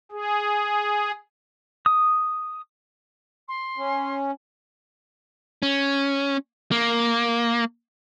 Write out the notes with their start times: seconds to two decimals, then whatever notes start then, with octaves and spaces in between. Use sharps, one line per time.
0.12 G#4
1.86 D#6
3.48 C6
3.77 C#4
5.63 C#4
6.71 A#3